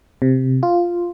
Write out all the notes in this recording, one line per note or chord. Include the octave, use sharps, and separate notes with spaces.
C3
F4